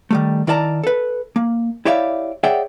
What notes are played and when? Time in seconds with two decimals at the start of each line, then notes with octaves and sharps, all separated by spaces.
0.11 D#3 G3 A3
0.47 D#3 E4 A#4 D5 A5 A#5
0.84 A4 B4
1.36 A#3
1.85 E4 G4 C#5 D5 E5 F5
2.43 G#4 C#5 D5 E5 F#5 G5